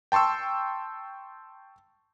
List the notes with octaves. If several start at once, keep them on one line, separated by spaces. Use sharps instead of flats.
G5 A5 C6 C#6 E6